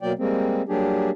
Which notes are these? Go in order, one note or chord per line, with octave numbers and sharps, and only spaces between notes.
B2 F#3 A#3 D5 G5
G3 G#3 A#3 C4
F#3 G3 A#3 D4 G4 G#4